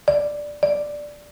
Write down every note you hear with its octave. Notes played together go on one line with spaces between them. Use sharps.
D5
D5